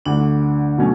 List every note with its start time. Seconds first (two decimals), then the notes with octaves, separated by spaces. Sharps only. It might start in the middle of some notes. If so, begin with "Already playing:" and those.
0.06 D2 D3 A3 D4
0.78 B2 F#3 A3 C#4